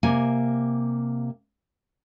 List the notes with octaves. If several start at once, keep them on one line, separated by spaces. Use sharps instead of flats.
C3 A#3 G#5